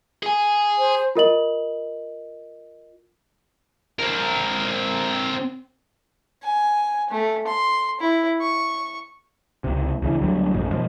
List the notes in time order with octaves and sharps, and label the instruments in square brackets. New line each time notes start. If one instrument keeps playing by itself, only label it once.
[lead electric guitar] G#4 G#5
[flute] C5
[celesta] F4 A#4 D#5 F#7
[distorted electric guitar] C4 A#4
[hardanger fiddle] G#5
A3
C6
E4
C#6
[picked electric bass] C#2 C3
D2 C#3 E3
D2 D3 F#3 G3
A#1 F2 G#2
B2 F3 G#3